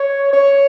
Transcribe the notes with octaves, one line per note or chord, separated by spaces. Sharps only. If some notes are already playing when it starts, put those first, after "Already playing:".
Already playing: C#5
C#5